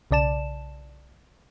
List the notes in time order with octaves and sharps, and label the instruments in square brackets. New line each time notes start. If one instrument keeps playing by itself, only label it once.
[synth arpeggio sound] B1 C#3 D5 A5 E7